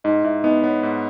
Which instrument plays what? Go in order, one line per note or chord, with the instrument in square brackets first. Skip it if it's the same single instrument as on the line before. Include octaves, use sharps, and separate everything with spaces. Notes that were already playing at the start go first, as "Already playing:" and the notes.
[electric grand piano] G#2 [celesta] D#4 D#5
[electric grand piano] G#2 [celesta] E4 E5
[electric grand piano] B3 [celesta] D#4 D#5
[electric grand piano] B3 [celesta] C#5
[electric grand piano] G#2